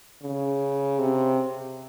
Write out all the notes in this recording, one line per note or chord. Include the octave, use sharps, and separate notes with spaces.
C#3
C3